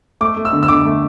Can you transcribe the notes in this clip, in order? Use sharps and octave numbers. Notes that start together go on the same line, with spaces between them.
A3 D6
A3
E6
D3
E6
D3 D6
A3